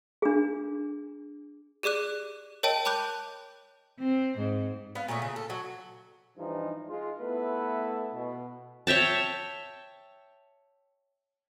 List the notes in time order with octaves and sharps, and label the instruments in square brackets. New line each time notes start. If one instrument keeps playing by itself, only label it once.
[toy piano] D4 G#4
[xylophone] G4 G#4 D5 D6 F#6
A#4 C#5 D#5 G5 A5 D7
G5 A5 B5 D6 F#6 G6
[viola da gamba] C4
G#2
[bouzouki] B3 F5
A#2 A3 C#4 G#4
C#3
A4
F#3
[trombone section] G2 E3 F3 D#4
G#3 F4
A3 B3 E4 A4 B4
B2
[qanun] C#5 E5 G5 A5